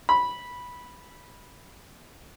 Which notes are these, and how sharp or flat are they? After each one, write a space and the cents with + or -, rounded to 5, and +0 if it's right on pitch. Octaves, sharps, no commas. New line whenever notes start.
B5 -10